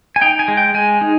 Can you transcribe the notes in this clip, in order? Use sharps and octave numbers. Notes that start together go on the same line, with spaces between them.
G#5
D#4 G5
G#5
G#3
G5
G#3 G#5
D#4